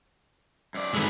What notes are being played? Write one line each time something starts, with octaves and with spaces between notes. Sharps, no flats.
F#2 D5
D#3 G#3 A4 B4